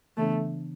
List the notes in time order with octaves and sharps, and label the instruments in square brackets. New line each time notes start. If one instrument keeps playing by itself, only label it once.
[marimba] C#3 E3 B3 D4 [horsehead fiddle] A3